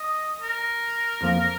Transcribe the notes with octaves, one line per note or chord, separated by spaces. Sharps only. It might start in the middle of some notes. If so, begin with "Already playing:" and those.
Already playing: D#5
A#4
F2 F3 A#3